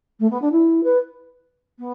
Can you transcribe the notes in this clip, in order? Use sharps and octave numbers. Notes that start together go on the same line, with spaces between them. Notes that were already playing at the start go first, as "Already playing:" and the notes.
A3
B3
D4
E4
B4
B3